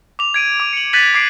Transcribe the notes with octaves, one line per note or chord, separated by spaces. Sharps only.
D6 F7
G#6 D7 D#7
D6
C#7 F#7
F#6 G#6 A6 B6 D#7 F#7
D6 G#6 C7 D7